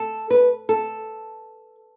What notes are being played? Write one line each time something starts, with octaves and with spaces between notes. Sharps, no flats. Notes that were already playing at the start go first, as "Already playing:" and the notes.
Already playing: A4
B4
A4